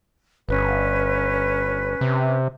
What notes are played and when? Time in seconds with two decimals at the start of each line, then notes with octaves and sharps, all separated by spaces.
0.49 G1 C#4 B4
2.01 C3